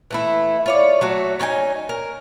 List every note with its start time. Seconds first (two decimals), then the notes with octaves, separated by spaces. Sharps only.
0.11 E3 A3 E4
0.66 F4 C#5 D5
1.01 F#3 A3 F#4
1.39 C#4 D#4 G5 G#5
1.89 A#4